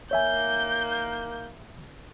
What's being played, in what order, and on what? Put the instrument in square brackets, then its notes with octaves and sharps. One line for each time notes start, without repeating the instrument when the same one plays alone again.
[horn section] D#3 A#3 [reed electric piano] C#5 E5 G#5 [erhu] G6